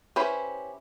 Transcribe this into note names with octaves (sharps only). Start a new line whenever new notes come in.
C#4 E4 G4 B4 C5